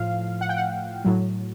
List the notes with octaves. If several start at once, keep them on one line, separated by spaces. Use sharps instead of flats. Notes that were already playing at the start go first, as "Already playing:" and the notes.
Already playing: A2 F3 F5
F#5
G5
F#5
A2 F#3